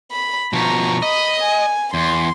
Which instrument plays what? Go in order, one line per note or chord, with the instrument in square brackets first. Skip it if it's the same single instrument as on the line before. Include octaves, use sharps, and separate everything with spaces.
[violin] B5
[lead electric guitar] B2 F3 [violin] A#5 C#6
[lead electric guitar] D#5 [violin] B5 D#6
[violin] G#5
[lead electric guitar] E2 [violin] C6